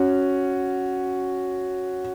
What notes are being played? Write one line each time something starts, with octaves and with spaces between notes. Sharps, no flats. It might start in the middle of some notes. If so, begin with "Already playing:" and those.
Already playing: C#4 F#4